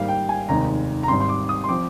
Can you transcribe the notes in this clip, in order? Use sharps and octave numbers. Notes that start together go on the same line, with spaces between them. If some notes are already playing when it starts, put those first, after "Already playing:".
Already playing: G#1 G#2 G3 A#3 F5
G5
G#5
F1 D#2 D#3 G#3 C4 A#5
A#5
G#1 G#2 G3 C4 C6
C6
D6
D#6
C6
F3 C4 D6